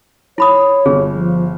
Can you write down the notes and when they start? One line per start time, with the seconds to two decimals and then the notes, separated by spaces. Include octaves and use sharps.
0.38 E4 C#5 B5 D#6
0.86 G1 G#4
1.14 F3